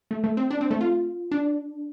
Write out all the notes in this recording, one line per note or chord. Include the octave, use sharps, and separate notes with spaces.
A3
A3
C4
D4
C4
A3
F4
D4